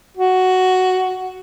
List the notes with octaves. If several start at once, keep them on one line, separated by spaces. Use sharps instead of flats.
F#4